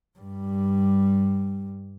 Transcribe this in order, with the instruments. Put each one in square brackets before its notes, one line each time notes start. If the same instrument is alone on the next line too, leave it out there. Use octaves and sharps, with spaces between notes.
[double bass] G2 G3